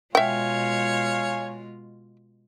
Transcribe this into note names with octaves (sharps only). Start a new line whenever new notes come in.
B2 G#3 F4 C#5 E5 F5 G5 G#5